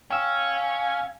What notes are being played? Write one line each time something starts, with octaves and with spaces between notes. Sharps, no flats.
C#4 F5 G5 E6